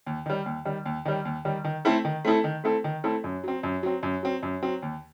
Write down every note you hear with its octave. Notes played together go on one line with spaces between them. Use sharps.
D#2
D#3 G3
D#2
D#3 G3
D#2
D#3 G3
D#2
D#3 G3
D#3
A3 C4 E4 A4
D#3
A3 C4 E4 A4
D#3
A3 C4 E4 A4
D#3
A3 C4 E4 A4
F#2
F#3 C4
F#2
F#3 C4
F#2
F#3 C4
F#2
F#3 C4
D#2